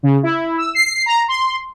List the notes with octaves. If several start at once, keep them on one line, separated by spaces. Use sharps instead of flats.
C#3
E4
E6
C7
A#5
C6